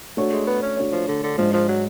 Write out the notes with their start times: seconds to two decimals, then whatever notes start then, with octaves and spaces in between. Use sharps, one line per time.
0.17 A3 D4 F#4 C#5
0.32 G#3
0.47 B3
0.62 C#4
0.77 A3 D4 F#4 C#5
0.92 F3
1.08 D3
1.23 D3
1.38 G#2 F3 G#3 D4
1.53 F3
1.68 F#3